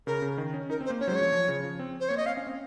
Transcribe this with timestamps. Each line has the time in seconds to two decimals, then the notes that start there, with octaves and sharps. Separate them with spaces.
0.07 C#3 A#4
0.22 C#3
0.38 D#3
0.54 C#4
0.70 D#4 A#4
0.81 C4
0.86 C5
0.90 A#3
1.00 C#4 C#5
1.07 F#3 C5
1.11 G#3 C#5
1.21 F3
1.32 F3
1.48 C#3
1.64 F3
1.79 C4
2.00 C5
2.09 A#3 C#5
2.17 D#5
2.26 C4 F5
2.37 C#4
2.47 C4